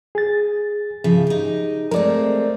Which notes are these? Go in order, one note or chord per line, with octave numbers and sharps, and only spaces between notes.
G#4 A6
C#3 F3 G#4 E5
D#4 G4
G#3 A3 C4 A#4 D5